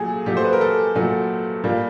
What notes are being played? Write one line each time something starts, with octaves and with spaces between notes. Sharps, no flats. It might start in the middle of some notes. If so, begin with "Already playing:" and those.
Already playing: A#2 F#3 A3 G#4
A#2 F#3 A3 G4
C5
B4
A#4
A4
A#2 F#3 A3
A#2 G3 A#3